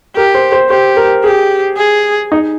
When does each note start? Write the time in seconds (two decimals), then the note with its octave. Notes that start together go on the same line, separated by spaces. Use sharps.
0.16 G4 A#4
0.35 C5
0.52 C5
0.70 G4 C5
0.97 A#4
1.24 G4 G#4
1.77 G#4
2.32 D#4